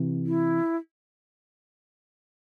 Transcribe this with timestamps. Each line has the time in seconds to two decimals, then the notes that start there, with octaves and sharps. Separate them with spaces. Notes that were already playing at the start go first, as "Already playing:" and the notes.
Already playing: C3 E3
0.26 E4